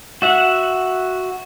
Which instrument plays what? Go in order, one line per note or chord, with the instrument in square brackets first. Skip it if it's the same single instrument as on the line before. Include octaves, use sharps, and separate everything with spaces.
[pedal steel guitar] F#4 E5 F#5